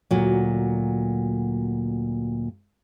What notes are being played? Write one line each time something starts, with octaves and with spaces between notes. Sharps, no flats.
D2 A#2 F#3